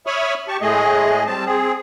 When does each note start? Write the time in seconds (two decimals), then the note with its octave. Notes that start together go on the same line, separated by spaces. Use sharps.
0.06 C#5 E5 B5 C#6 D#6 F6
0.48 G4 A5 C#6
0.61 A2 G#3 A3 G#4 D#5
1.27 G3 C4 A5
1.46 C4 G#4